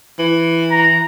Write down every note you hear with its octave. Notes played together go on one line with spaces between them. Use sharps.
E3
A#5